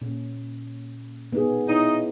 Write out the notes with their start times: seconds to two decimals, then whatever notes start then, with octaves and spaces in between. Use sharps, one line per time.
0.01 A#2 C#4
1.33 B3 D#4 G#4
1.67 D#4 E4 C#5